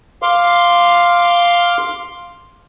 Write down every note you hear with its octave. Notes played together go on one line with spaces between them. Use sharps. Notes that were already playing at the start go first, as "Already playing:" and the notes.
F5 C6 D6